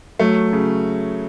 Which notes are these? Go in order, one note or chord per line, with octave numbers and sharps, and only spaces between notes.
F#3 A3
C#3